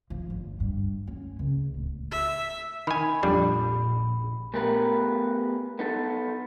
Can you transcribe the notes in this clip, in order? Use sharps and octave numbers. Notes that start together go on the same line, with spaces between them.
F3
G1
G2
C#4
C#2
D1
E5
D#3 G#5 B5
A#1 F2 G3 D4
A3 B3 G4 A#4 B4
B3 D#4 A4